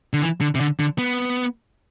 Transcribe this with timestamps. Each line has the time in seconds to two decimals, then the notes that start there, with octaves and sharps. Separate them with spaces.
0.13 D3
0.22 E3
0.41 D3
0.55 C3
0.60 D3
0.80 D3
0.98 B3